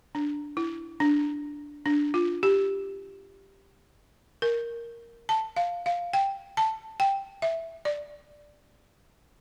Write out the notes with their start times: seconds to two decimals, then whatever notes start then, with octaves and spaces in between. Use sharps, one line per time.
0.15 D4
0.57 E4
1.00 D4
1.86 D4
2.14 F4
2.43 G4
4.42 A#4
5.29 A5
5.57 F5
5.86 F5
6.13 G5
6.57 A5
7.00 G5
7.42 E5
7.85 D5